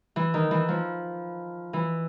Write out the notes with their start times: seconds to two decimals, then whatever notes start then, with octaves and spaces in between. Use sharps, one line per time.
0.16 E3
0.34 D#3
0.51 E3
0.69 F3
1.73 E3